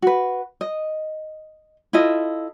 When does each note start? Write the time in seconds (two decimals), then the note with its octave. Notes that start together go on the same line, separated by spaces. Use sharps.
0.02 F#4 B4
0.61 D#5
1.93 E4 F4 A4 D#5